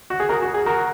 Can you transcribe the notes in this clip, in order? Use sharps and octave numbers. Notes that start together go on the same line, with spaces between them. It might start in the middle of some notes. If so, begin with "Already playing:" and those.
F#4
G#4
F#4 A#4
F#4
G#4
F#4 A#4